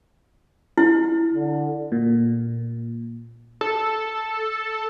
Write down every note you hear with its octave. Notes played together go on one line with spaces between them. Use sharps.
E4
D3
A#2
A4